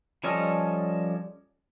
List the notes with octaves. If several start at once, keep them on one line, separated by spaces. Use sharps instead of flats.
F3 G3 C#4 A4 D#5